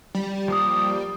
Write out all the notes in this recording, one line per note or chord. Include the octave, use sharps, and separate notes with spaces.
G3
F3 A#3 D#6